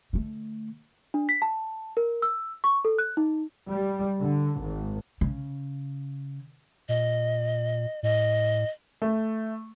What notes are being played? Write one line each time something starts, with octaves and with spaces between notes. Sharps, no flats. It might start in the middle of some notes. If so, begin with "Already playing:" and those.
D3 A3
D4
B6
A5
A#4
E6
C#6
A4
F#6
D#4
G3
D3
G#1
C#3
A#2 D#5
A2 D#5
A3